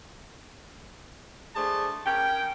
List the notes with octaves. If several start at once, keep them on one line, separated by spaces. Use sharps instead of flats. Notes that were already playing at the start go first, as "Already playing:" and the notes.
A3 D4 G#4 C5 A5
C#4 A#4 G5